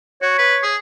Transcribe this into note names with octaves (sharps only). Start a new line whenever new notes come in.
F#4 C#5
B4
G#4